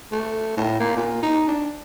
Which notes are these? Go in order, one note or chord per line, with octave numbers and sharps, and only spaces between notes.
A3
A2
A#3
A#2
D#4
D4